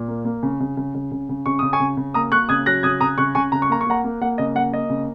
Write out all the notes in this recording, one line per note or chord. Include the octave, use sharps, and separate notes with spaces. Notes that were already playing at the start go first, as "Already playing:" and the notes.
Already playing: A#2
A#3
A#3
C#3
C#3
C#3
C#3
C#3
C#3
C#3 C#6
C#3 D#6
G#5 C#6
C#3
C#3
A#3 A#5 D#6
A#3 C#6 F#6
C#3 D#6 G#6
F#3 F#6 A#6
C#3 D#6 G#6
C#3 A#5 D#6
C#3 C#6 F#6
C#3 G#5 C#6
C#3 A#5
C#6
A#3 A#5
C#6
A#3 F#5 A#5
A#3
A#3 F#5
C#3 D#5
A#3 F#5
A#3 D#5
C#3